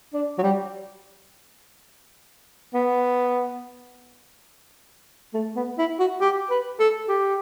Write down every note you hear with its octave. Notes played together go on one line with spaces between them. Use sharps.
D4
F#3
G3
B3
A3
B3
E4
F#4
G4
B4
A4
G4